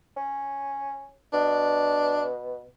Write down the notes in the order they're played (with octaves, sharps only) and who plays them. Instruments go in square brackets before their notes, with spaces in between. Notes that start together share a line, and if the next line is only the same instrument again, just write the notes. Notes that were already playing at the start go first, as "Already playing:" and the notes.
[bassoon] C#4
[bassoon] B2 [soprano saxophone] D4